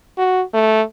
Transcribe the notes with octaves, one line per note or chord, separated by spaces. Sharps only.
F#4
A3